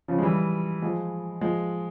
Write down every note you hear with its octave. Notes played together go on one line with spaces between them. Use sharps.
C#3 F3
G#3
E3 G3
F3 G#3
F3 G#3